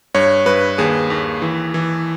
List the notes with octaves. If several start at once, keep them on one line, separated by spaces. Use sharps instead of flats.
G2 C#5
G2 B4
D#2 G#4
D#2
E3
E3